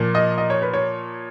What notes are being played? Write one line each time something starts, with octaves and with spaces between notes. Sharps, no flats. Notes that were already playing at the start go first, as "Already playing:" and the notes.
Already playing: A#2 F3 A#3
D#5
D#5
C#5
B4
C#5